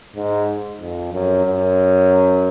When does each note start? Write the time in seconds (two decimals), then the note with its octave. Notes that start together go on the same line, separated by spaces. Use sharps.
0.16 G#2
0.81 F2
1.13 F#2
1.45 F#2